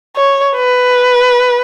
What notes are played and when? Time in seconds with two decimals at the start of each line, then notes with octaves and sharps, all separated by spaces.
0.16 C#5
0.56 B4